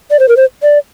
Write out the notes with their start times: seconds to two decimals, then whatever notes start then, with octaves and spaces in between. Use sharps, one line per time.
0.11 D5
0.19 C5
0.28 A#4
0.37 C5
0.63 D5